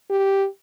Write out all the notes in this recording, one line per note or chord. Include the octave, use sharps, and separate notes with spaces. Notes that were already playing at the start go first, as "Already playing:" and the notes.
G4